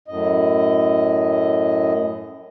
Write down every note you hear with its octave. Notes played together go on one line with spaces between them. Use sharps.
F#2 A2 D#5